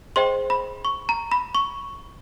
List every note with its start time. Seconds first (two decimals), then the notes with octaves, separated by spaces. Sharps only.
0.16 G#4 C5 D#5 G5 C6
0.50 B5
0.85 C#6
1.09 A#5
1.32 B5
1.55 C#6